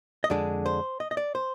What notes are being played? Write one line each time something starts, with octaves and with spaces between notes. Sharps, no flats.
D#5
F2 D3 G#3 D4 D5
C5
D#5
D#5
D5
C5